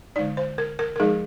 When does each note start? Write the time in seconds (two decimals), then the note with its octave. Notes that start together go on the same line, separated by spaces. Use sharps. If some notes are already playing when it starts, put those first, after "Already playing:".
0.16 D3 G#3 D#4 D5
0.37 C5
0.58 A#4
0.79 A#4
0.96 A#4
1.00 F3 G#3 D#4 G#4